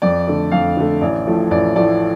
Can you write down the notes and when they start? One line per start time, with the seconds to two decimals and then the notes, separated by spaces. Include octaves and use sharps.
0.02 F2 D5
0.27 D3 A3
0.52 F2 F5
0.77 D3 A3
1.01 A1 D5
1.26 A2 F3 A3
1.51 A1 D5
1.76 A2 F3 A3 D5